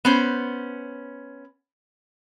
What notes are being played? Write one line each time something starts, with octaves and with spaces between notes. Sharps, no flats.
B3 C#4 C5